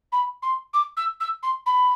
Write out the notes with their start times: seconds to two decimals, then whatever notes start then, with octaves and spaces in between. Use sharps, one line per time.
0.12 B5
0.42 C6
0.74 D6
0.97 E6
1.20 E6
1.43 C6
1.66 B5